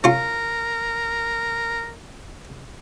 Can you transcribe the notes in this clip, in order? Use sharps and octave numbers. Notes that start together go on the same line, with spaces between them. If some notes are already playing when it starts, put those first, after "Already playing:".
C#4 F4 A#4